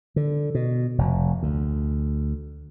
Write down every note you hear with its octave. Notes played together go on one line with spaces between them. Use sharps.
D3
B2
F1
D2